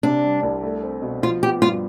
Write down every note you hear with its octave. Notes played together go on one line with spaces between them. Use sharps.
C3 D4
G3
C2
A3
C4
B2
F3 F4
B3 G4
G2 F4